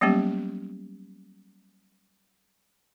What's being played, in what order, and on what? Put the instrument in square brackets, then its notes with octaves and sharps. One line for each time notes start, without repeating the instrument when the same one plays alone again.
[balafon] F#3 G3 A#3 B3 C#4 G4